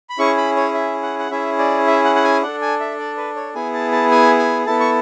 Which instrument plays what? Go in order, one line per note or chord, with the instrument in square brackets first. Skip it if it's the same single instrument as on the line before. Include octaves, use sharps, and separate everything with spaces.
[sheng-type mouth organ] B5
C#4 E4 G#4 C#6
B5
C#5
E5
F#5
F#5
C#4 E4 G#4 E5
D5
E5
F#5
F#5
G#5
D4 A4 F#5
G#5
E5
D5
B4
C#5
B3 E4 G#4 G#5
A5
A5
G#5
G#5
B3 E4 A4 A5
C#6